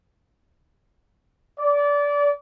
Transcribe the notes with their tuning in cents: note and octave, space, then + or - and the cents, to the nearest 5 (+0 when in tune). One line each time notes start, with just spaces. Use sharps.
D5 -25